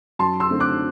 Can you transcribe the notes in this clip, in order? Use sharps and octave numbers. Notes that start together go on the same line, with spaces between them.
F#2 A5 C6
C6 E6
D3 A3 C4
D6 F#6